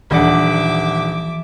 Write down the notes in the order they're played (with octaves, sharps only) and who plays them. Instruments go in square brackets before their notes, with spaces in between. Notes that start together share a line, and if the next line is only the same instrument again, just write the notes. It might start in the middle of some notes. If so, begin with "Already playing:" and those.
[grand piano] D#1 D4 F#5 [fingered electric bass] E3 F3 [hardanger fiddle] E5 D6